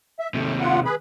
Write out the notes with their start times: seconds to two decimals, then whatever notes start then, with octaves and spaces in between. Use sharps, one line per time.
0.19 E5
0.34 D#2 C3 A3
0.61 F4 F#5
0.85 G#4 B4 B5